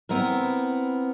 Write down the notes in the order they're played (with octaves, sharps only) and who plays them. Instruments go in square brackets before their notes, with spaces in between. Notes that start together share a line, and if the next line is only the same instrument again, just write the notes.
[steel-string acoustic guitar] B3 C4 E4 A#4